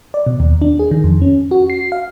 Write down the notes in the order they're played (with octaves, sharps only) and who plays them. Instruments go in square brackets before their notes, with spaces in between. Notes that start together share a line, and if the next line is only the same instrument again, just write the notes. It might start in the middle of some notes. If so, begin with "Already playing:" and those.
[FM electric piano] D5
B2
D#2
D4
G#4
D#3
F2
C#4
F#4
C7
F5